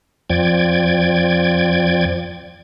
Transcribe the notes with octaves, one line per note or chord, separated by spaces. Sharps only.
F2 F3 D5 G5 G#6